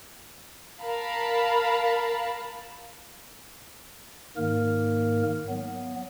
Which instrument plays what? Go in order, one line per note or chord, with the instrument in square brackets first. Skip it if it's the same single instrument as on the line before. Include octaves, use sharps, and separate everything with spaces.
[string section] A#4 F5 A5 B5
[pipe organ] G#2 D#3 A#3 A#4
F#3 B3